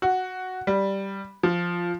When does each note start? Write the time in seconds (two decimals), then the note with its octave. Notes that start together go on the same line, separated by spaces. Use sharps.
0.02 F#4
0.67 G3
1.43 F3